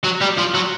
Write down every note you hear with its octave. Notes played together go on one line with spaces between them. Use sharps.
F#3
G3
F3
F#3